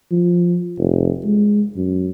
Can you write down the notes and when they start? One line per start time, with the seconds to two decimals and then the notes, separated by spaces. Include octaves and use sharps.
0.11 F3
0.78 F1
1.25 G#3
1.76 F#2